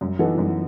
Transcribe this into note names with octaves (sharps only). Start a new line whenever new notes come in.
F#2
E3 B3 D#4 A4
F#2